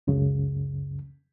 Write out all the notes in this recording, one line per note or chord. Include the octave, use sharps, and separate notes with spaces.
C#2 F#2 C#3